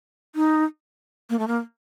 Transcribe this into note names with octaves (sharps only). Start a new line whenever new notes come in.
D#4
A#3
A3
A#3